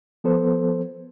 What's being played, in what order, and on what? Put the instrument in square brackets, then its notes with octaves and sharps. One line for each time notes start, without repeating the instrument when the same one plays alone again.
[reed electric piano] F3 B3 A4 C5